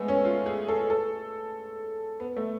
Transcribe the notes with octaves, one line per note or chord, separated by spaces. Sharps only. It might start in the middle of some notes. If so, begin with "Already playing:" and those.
Already playing: G#3 A3 B3
C#4
F4
G#4
A4
A4
B3
A3